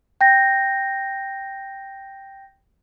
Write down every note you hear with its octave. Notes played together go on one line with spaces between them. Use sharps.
G5 G6 A#6